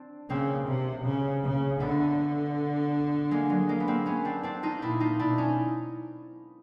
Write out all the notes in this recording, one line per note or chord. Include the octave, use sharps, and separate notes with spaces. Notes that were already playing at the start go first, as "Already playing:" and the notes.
Already playing: C4 D4
C#3 A#3 C4
C3
C#3
C#3
D3 A3 B3
G#3 A#3
F#3 G#3
G#3 A#3
B3
A#3 C4
B3 C#4
C4 D4
C4 D4
D#4 F4
A#2 D4 E4
D#4 F4
B2 D4 E4
C#4 D#4